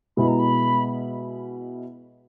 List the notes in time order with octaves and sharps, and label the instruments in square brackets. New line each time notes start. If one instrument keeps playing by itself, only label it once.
[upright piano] B2 G#3 B3 E4 [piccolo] B5
[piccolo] A#5
B5